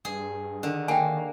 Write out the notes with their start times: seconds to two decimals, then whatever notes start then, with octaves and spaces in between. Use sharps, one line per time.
0.05 G2 G#4
0.63 D3 D#3
0.88 A#3 G5 G#5